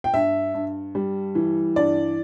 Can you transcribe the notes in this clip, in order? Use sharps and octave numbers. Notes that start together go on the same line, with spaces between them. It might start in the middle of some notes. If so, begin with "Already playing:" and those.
G5
G2 E5
G2
G3
E3
G2 D5